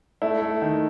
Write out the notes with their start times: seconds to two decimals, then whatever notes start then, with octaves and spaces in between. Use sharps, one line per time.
0.22 A3 E4
0.42 A3
0.62 D#3